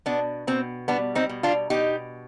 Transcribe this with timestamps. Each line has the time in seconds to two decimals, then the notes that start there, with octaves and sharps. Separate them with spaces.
0.06 B2 B3 D4
0.47 B2 C4
0.88 G3 B3 D4
1.15 C4 D#4
1.29 B2
1.43 D4 F4
1.70 B2 D#4 G4